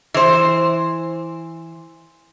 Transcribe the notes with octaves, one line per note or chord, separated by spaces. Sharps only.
E3 C5